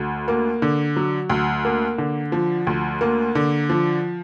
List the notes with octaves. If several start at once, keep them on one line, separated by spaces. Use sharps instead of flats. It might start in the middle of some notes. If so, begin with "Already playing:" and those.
Already playing: D2
A#3
D3
F#3
D2
A#3
D3
F3
D2
A#3
D3
F3